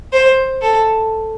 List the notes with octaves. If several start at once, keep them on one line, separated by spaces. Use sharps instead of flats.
C5
A4